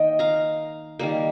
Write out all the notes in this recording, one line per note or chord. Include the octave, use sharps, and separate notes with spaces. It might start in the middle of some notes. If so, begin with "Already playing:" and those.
Already playing: D#3 A#3 D#5 G5
F5 A#5
D#3 G3 A#3